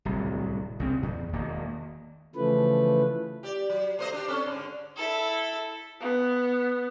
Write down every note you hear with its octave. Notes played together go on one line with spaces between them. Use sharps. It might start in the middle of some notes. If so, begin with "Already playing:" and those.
D1 C2
C2 C#3 C4
E2
E1 D#3 A#3
C#3 E3 F3 A3 B4
G4 D5
F#3
A3 C5 D#5
D4 G4
C4 C#4 A4
G#2 D3
E4 A4
B3